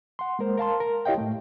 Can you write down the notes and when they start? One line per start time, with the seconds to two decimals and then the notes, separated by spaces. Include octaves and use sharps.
0.19 F#5 C6
0.39 G#3 A#3 A#4 C5
0.58 A#4 F5 A5 C6
0.80 A#4
1.05 E4 G4 C#5 D#5 F5 G5
1.18 A2 A3